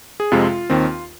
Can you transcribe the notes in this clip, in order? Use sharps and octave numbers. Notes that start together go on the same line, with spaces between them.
G#4
F2 C3 G#3 C4 F4
D#2 D#3 C4